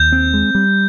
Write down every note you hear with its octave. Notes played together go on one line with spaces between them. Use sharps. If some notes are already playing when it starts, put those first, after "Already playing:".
Already playing: D#2 G6
C4
G#3
G3